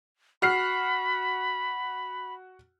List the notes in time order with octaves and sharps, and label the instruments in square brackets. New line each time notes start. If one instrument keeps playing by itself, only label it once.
[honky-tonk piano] F#4 F6 C7 [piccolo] B5